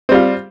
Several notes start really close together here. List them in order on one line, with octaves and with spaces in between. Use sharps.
C4 G3 F4